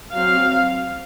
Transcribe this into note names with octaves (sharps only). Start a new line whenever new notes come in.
F#3 C4 F5